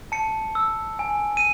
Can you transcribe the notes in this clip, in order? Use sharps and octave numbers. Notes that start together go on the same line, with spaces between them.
A5 C#7
E6
G#5
D#7